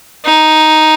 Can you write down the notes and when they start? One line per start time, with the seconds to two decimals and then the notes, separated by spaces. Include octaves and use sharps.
0.25 D#4